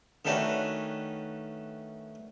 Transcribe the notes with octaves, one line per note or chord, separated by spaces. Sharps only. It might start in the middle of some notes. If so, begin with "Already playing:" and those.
D#3 A3 C#4 D4 F#4 B4